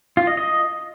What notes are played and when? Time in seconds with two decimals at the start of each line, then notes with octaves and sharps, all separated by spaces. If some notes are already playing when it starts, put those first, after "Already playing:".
0.17 F4
0.27 D#5
0.37 D#5